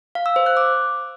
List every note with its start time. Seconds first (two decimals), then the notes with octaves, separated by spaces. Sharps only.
0.15 F5
0.26 E6
0.36 C5
0.46 F#6
0.57 D6